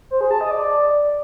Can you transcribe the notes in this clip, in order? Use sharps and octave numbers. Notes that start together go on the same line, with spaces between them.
C5
G#4
A5
D#5
D5